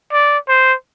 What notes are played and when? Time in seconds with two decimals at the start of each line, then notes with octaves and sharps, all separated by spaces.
0.13 D5
0.49 C5